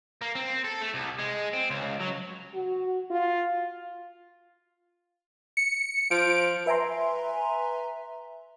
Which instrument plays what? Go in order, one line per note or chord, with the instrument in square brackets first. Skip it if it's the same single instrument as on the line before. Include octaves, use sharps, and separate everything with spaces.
[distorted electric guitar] A#3
C4
A4
A3
C2
G#3
C4
C#2
F#3
[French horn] F#4
F4
[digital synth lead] C#7
[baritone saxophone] F3 [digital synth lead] D7
[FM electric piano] B4 E5 G#5 A#5 C6